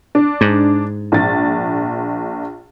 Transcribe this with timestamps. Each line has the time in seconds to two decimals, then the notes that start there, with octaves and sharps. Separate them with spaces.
0.15 D4
0.41 G#2
1.12 A#1 A6